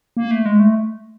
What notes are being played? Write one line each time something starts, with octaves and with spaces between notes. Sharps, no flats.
A#3
A3
G#3
A3